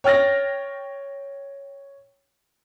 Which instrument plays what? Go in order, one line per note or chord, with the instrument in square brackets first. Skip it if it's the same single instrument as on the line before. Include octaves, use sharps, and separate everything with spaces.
[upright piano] C#5 G5 F6 A6 A#6